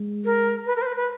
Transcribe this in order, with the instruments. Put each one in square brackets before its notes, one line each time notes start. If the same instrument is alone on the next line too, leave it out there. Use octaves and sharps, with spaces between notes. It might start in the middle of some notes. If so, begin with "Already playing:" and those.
Already playing: [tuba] G#3
[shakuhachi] A#4
B4
A#4
C5
B4
B4